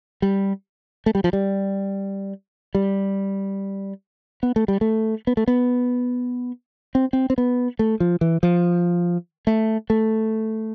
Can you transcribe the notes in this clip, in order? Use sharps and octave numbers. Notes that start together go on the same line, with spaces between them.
G3
A3
G3
F3
G3
G3
B3
A3
G3
A3
B3
A3
B3
C4
C4
C4
B3
A3
F3
E3
F3
A3
A3